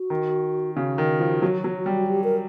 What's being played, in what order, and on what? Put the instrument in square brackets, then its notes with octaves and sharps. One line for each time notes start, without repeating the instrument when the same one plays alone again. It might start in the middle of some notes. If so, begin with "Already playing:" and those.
Already playing: [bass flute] F#4
[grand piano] D#3
[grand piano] C#3 [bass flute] F#4
[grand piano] D#3
F3
F#3
F#3
G3
[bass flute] G4
A#4